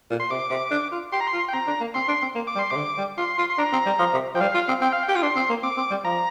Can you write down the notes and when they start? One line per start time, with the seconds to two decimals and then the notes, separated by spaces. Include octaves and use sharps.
0.10 A#2
0.20 C6
0.30 C3 D6
0.50 C3
0.71 D4
0.92 F4
1.12 G4 C6
1.20 A#5
1.27 C6
1.33 F4
1.48 G5
1.53 C4 A#5
1.67 D4
1.81 A#3
1.94 C4 C6
2.08 D4
2.22 C4
2.35 A#3
2.47 D6
2.55 G3
2.59 C6
2.70 C3 D6
2.76 D3
2.98 G3
3.18 F4 C6
3.38 F4
3.50 C6
3.58 D4 A#5
3.73 C4
3.86 G3
3.99 F3
4.14 C3
4.35 F3 G5
4.40 G3 F5
4.54 F4
4.68 C4
4.81 C4 G5
4.92 F5
5.03 G5
5.08 G4
5.15 F4
5.22 D4 C6
5.36 C4
5.49 A#3
5.63 C4 D6
5.77 C4
5.91 G3
6.05 F3 A#5